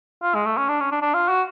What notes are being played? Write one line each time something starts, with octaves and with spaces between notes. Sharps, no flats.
F4
G#3
A3
C#4
D4
C#4
D4
D4
F4
F#4